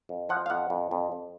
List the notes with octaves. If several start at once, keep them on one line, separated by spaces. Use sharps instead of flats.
F2
F3 F#5
F5
F2 F#5
F2
F2
F2